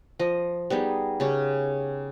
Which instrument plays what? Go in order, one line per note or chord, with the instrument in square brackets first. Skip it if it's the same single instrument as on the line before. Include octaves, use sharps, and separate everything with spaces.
[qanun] F3 D#5
G3 B3 D#4 G#4
C#3 C#4 G4